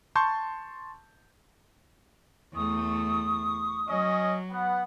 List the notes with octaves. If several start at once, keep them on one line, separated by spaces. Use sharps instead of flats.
A5 C6 C#6 G6 A6
E2 A3 C#6 D#6
F#3 C#4 D#5
B3 F#5